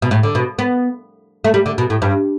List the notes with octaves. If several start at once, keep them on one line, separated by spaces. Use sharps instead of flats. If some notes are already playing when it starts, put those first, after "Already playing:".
B2
A2
D3
B2
B3
A3
G3
D3
B2
A2
G2